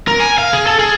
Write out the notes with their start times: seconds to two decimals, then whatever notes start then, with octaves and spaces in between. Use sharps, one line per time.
0.08 A#4
0.20 G#5
0.38 F5
0.53 G#4
0.66 A4
0.79 G#4